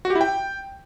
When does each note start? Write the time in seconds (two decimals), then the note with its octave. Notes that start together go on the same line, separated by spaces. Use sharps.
0.05 F#4
0.10 G4
0.15 E4
0.21 G5